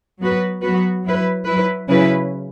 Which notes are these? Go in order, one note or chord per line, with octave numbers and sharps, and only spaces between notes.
F#3 B3 F#4 B4
F#3 B3 F#4 B4
F#3 E4 B4
F#3 E4 B4
C#3 F#3 C#4 E4 B4